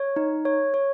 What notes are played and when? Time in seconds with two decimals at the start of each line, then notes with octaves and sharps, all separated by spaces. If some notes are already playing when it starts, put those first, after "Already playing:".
Already playing: C#5
0.16 D#4
0.45 C#5
0.74 C#5